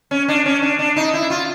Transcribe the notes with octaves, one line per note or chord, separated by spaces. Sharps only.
C#4
D4
C#4
D4
D4
D#4
E4
F4